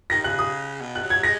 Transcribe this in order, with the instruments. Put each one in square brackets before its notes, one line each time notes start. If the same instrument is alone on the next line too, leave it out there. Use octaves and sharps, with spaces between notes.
[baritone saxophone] D#3 [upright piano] A#6
[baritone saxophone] C#3 [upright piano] F#6
[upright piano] D#6
[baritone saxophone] B2
[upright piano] F#6
[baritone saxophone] F#3
[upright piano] G#6
[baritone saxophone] G#3 [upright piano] A#6